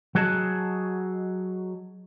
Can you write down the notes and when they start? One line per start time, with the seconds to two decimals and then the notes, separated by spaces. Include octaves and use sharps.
0.15 F#3 F#4 G#4 D#5 A5